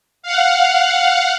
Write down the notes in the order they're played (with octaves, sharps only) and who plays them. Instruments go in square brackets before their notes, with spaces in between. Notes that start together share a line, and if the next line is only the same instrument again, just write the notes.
[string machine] F5 F#5